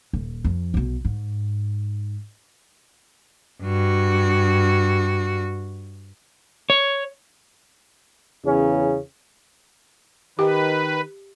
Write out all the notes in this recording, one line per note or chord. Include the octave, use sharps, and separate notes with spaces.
D#1
F2
B1 B2
G#2
G2 F#4
C#5
E2 C#3 C#4
D#3 G4 B4